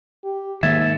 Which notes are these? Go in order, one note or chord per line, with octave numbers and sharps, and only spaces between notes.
G4
G#2 D#3 A#3 E5 G#6 A6